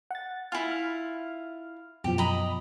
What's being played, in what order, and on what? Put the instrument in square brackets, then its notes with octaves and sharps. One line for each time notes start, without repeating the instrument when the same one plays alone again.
[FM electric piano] F#5 A6
[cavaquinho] E4 F4 [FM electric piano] G#5 F6
[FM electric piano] F6
[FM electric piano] F#2 B2 F3 [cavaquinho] G4
[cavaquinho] D#5 A#5 B5